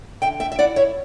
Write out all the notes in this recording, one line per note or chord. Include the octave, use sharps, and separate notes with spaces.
D3 E5 G5
E5 G5
E5
E4 D5 F#5
C#5 E5